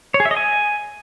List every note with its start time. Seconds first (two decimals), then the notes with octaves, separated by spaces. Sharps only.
0.14 C#5
0.20 G#4
0.25 E5
0.31 D#5
0.37 G#5